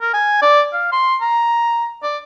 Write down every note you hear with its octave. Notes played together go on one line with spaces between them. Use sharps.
A#4
G#5
D5
F5
C6
A#5
D5